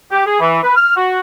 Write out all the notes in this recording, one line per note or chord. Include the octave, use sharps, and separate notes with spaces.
G4
G#4
E3
B4
F6
F#4